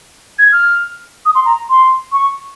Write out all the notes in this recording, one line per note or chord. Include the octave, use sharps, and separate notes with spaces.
G#6
F6
D#6
C6
A#5
C6
C#6